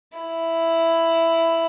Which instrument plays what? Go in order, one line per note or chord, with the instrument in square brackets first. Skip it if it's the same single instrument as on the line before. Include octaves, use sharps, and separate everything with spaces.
[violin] E4